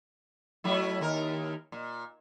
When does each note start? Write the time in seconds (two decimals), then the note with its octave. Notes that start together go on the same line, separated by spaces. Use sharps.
0.64 F#3 A3 E4
1.01 D#2 A#4
1.72 A#2